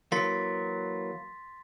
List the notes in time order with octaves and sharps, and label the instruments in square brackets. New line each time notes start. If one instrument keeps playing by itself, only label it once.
[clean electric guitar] E3 F#3 A#3 [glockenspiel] C6 A6 B6